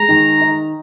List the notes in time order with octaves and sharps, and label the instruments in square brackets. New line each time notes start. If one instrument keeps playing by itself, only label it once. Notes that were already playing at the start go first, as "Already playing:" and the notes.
Already playing: [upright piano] G#3 [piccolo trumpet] A#5
[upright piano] D#3
D#4